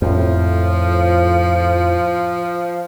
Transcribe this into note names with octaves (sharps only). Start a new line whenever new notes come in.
F2 A2 F3